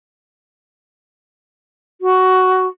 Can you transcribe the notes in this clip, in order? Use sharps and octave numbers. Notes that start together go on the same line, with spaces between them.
F#4